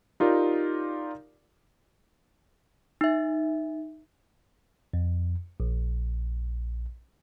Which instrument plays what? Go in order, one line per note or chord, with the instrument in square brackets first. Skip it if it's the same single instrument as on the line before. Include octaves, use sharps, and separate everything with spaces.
[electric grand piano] D#4 F4 G4 A#4 D5
[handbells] D#4 E5
[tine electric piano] F2
A#1